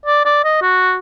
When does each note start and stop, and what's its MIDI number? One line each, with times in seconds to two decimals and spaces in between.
0.06 0.24 74
0.25 0.41 74
0.44 0.61 75
0.62 0.97 66